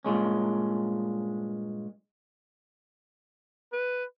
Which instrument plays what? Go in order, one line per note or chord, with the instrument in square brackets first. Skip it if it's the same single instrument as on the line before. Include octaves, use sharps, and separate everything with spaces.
[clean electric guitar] G2 A#2 G#3 C#4
[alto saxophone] B4